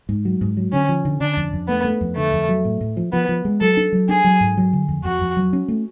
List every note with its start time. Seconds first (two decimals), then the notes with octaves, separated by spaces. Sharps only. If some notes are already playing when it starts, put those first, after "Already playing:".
0.09 G#2
0.25 F#3
0.41 G#2
0.57 F#3
0.72 D3 C#4
0.89 F3
1.05 D3
1.20 D3 D4
1.37 F2
1.53 F2
1.69 A3 B3
1.84 A3
2.01 F2
2.16 D3 A3
2.33 F2
2.48 F#3
2.65 A2
2.81 A2
2.97 F3
3.13 F3 B3
3.29 F3
3.45 G#3
3.61 F#3 A4
3.77 D4
3.93 F#3
4.09 D4 G#4
4.24 F#3
4.41 G#2
4.57 F#3
4.73 D3
4.88 F2
5.05 F2 F#4
5.21 F2
5.37 F#3
5.53 C#4
5.68 A3